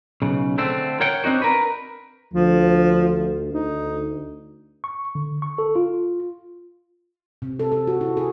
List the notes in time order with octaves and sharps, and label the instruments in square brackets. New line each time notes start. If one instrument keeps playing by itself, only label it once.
[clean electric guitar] B1 C#3
D3 A3 C4
A#4 C#5 F#5 G5
C4 D4 D#4 F#4
A#4 B4
[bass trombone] D2 [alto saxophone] F3
[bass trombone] D2 [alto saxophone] D#4
[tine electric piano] C#6
D3
C#6
A4
F4
[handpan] C3
A4
A4
F#4
E4
G#4